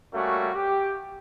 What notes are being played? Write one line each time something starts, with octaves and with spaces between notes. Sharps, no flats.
G3 A3 A#3 C#4 F#4
G4